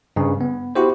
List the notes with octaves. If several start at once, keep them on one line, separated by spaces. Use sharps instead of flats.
G2 C#3
B3
E4 F#4 G4 C5